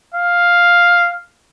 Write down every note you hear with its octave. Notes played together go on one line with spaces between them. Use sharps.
F5